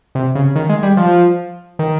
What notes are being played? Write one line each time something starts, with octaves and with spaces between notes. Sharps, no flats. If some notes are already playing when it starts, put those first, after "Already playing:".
C3
C#3
D#3
G#3
G3
F3
D#3